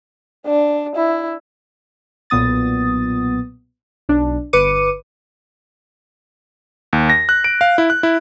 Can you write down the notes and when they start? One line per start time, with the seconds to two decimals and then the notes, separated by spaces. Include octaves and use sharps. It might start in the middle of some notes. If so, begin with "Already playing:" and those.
0.47 D4
0.95 E4
2.30 B1 A#2 B3 D#6 A6
4.09 B1 D4
4.53 G1 B4 D6 C#7 D#7
6.93 D#2
7.10 A#6
7.29 F#6
7.44 D7
7.61 F5
7.78 E4
7.90 F#6
8.03 E4